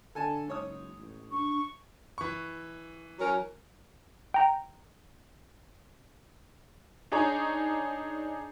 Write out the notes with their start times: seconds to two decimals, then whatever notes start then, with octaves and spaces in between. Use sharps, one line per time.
0.15 D3 A4 G#5 A5
0.48 F#1 G#2 C#5 D#6
0.99 A1
1.30 D4 C#6
2.18 E3 C#6
3.19 F#3 C#4 A#4
4.34 G5 A#5
7.12 D4 D#4 G#4 C#5 A#5